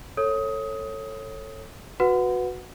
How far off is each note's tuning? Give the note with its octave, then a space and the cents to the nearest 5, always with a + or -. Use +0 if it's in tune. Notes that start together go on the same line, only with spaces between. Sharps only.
A4 +15 C#5 -15 D#6 +20
F#4 -10 B4 +0 F#5 -10